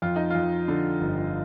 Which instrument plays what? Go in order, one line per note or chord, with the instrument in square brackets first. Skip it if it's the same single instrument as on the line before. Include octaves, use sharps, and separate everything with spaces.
[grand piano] F2 [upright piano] F4
[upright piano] D#4
[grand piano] F2 [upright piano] F4
[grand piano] D3
G1